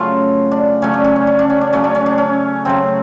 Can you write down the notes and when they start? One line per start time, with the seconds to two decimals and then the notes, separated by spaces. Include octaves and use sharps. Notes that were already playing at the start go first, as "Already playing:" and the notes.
Already playing: C#3 F#3 A3 F4
0.51 D4
0.82 C#3 F#3 A3 C#4
0.94 D4
1.04 C#4
1.16 D4
1.27 C#4
1.39 D4
1.50 C#4
1.61 D4
1.73 C#3 F#3 A3 C#4
1.84 D4
1.95 C#4
2.06 D4
2.18 C#4
2.65 C#3 F#3 A3 C4